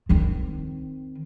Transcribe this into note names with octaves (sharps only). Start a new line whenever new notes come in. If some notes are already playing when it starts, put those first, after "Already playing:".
D#3 C4